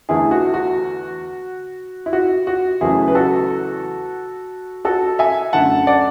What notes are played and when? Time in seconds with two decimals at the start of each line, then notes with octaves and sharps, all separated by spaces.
0.09 E2 D3 A3 E4 G#4
0.31 F#4
0.54 F#4
2.06 E4
2.13 F#4
2.47 F#4
2.81 E2 C#3 F#3 A3 E4 G#4
3.08 B4
3.15 F#4 A4
4.85 F#4 A4
5.19 E5 G#5
5.53 F#2 D3 A3 F#5 A5
5.87 D5 F#5